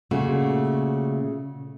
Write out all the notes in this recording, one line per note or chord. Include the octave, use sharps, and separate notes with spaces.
A#2 C#3 A3 F#4